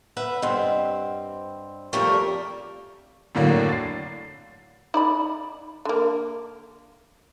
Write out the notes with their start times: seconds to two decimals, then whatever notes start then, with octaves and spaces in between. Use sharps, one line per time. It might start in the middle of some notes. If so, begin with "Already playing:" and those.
0.17 B4 E5 F#5
0.42 G2 C4 D#5 F#5 C6
1.93 F2 G3 A3 A#3 A#4 C#6
3.35 F#2 A2 D3 A#3
3.69 A6 C7
4.94 D#4 D5 B5
5.85 D3 A#3